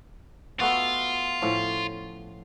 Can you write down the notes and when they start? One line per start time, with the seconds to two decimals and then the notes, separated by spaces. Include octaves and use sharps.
0.60 A3 B3 F4 F#4
1.42 A2 F3 C#4